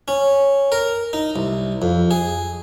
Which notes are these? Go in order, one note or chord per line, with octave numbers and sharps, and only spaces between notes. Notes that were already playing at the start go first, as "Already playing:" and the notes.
C#4
A#4
D#4
C2
F2
G#4